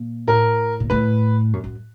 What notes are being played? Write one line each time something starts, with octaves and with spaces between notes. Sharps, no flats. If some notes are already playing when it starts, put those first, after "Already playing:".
Already playing: A#2
A2 A#4
A#2
A2 B4
F#2
F#2